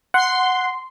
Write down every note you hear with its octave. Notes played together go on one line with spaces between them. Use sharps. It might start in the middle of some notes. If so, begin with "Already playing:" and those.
F#5 C6